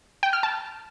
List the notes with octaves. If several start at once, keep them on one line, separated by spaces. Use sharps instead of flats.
G5
F6
A5